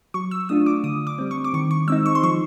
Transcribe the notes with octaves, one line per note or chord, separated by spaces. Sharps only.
F#3 C#6
E6
A3 D4 F4 D#6
D6
D3 D#6
D6
G3 C4
C#6
D6
D#3 C#6
C#6
G#3 C4 D#4 E6
C#6
C6
F3 C#6